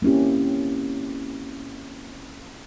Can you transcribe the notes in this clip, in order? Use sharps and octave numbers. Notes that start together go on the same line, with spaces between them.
A#3 C4 C#4 E4 G4